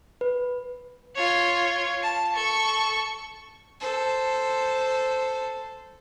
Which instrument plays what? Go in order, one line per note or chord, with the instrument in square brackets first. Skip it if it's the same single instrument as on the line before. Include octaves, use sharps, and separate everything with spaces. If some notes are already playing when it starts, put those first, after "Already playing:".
[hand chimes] B4
[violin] F4 C#5
A5
A4 C#6
[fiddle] A4 C5